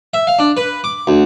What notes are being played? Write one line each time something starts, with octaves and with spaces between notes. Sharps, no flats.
E5
F5
D4
B4
D6
D2